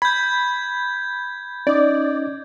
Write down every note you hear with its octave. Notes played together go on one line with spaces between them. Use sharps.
B5 G6 G#6
C#4 D#4 D5 D#5